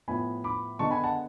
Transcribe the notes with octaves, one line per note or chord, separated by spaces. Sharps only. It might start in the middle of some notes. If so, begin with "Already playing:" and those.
A2 F3 B3 G#5 B5
B5 D6
D3 G#3 B3 A5 C#6
G#5 B5
F#5 A5